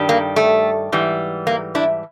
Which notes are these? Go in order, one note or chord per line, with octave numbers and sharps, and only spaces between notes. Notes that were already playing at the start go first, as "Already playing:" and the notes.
Already playing: G2 D#3 G3
A#3
A3
G#2 E3 G3
A#3
D4 E4